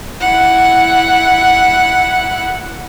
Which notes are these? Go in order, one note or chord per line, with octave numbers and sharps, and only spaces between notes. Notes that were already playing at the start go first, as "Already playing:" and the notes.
E4 F#5